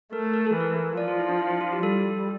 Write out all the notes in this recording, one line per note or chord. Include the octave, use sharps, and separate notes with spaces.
A3 A#4
A#4
A4
E3
A#4
F3 D5
F4
E4
D4
E4
E4
F4
G4
G3 A4